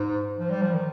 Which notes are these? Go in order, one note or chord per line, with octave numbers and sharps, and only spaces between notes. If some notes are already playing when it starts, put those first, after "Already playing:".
Already playing: G#2
F3
G3
F3
D#3